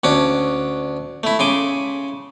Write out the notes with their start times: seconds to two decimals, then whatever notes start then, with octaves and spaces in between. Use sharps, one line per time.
0.04 D2 C#4 D4 D6
1.23 A3 E4
1.39 C#3 G#5 C6 D6